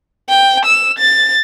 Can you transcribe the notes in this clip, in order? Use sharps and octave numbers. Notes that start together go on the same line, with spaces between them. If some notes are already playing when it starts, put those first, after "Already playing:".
G5
E6
A6